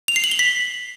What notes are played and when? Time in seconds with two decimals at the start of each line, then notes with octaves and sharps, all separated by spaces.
0.08 F7
0.16 C7
0.24 F#7
0.31 G7
0.39 B6